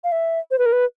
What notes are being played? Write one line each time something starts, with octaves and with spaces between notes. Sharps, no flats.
F5
E5
C5
B4
A#4
B4